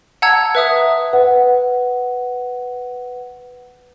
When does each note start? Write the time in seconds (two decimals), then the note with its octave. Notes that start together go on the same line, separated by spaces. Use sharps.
0.22 F#5 A5 A#5 E6 G#6
0.55 B4 E5 D#6
1.13 B4 F#5